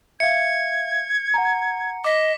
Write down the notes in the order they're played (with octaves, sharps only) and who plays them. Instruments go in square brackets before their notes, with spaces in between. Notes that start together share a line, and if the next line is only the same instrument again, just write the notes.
[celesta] E5 F5 [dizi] G#6 [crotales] C#7
[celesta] F#5 G#5 A#5
[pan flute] D#5 [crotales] D6 B6